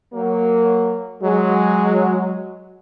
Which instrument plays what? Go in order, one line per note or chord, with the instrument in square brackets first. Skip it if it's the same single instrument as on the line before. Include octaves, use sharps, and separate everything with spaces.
[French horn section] F#3 A#3
[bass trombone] F#3 [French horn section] G#3